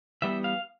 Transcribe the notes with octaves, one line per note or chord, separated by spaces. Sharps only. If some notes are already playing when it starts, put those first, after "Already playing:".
E3 G3 B3 E5
F5